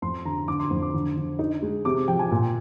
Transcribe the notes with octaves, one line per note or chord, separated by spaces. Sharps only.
F2 C6
D3 A#5
D3 D6
C6
F2
D6
D3
D3
D#4
G#3
C3 D6
F3 G5
G#5
A#2